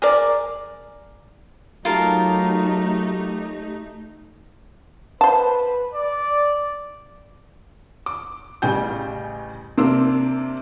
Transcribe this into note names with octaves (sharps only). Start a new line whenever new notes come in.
G#4 A#4 D5
F#3 A3 D#4 F4 G4 A#4 A5
B4 C5 A5
D5
D6
A1 C#3 G3 G5 G#5 G6
C3 A#3 D4 C6 E6